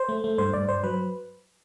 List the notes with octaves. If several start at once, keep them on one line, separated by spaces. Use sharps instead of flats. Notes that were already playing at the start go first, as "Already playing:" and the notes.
Already playing: C5
A3
A3
G2 C5
G2 D5
G2 C5
F#3 B4